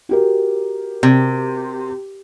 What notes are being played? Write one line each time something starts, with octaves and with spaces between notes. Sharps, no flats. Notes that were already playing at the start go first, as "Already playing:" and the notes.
F#4 G4 A#4
C3